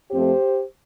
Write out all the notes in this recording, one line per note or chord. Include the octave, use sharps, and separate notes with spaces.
F2 F3 A3 C4 G4 C5